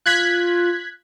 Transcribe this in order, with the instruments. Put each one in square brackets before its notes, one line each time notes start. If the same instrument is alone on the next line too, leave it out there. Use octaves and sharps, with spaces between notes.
[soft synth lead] F4 [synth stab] F#6 G#6 B6